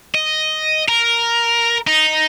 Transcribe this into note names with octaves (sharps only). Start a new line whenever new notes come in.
D#5
A#4
D#4